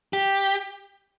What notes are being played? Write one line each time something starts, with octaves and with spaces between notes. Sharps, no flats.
G4